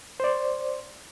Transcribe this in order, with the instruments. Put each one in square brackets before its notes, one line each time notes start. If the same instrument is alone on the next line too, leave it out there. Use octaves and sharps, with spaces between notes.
[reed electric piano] C5 D5